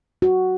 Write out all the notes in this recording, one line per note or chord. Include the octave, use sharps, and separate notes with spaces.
F#4